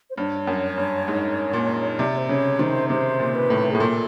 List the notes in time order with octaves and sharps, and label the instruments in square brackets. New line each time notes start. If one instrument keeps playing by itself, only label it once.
[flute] C5
[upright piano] G2 [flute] C#5
[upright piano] F#2
G2
G#2
A#2
[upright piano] C3 [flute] D5
[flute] C5
[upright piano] C#3 [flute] C#5
[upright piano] D#3 [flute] C5
[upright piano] C3 [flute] C5
[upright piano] A#2
[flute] B4
[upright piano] A2
[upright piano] A2 [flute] G#4
[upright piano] A#2 [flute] A4